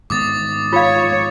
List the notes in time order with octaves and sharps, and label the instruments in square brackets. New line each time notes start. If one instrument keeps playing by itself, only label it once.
[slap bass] G#2 D#3 B3 [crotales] D6 D#6 A6
[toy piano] F4 F5 [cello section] C#5